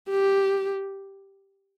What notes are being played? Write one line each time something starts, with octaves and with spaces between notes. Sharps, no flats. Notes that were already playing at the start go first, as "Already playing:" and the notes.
G4